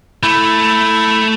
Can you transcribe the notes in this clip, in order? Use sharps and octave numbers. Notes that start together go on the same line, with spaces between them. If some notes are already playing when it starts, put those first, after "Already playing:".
A3 E4